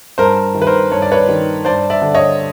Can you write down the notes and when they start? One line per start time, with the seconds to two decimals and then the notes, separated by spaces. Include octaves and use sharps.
0.18 G2 A#4 C5
0.54 D#3
0.62 B4
0.67 A#4 C5
0.91 G2 C#5
1.02 D5
1.11 B4 C#5
1.29 D#3
1.65 G2 C5 D5
1.90 D5 E5
2.02 D3
2.15 C#5 D#5